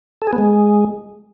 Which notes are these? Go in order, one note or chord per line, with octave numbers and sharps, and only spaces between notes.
A4
G#4
B3
G#3